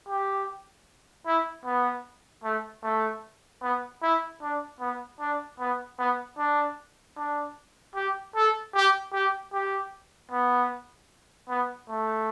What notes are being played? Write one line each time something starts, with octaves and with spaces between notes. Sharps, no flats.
G4
E4
B3
A3
A3
B3
E4
D4
B3
D4
B3
B3
D4
D4
G4
A4
G4
G4
G4
B3
B3
A3